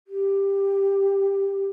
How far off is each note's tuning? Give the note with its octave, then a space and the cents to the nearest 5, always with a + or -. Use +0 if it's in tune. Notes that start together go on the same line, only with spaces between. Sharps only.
G4 +10